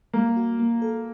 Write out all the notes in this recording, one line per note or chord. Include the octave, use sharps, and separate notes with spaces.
G3 A#3
F#4
A#3
A4